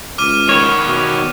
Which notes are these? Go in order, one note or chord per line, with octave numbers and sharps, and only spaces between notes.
C#2 D6 F6 D#7
D#3 B3 C#5
B2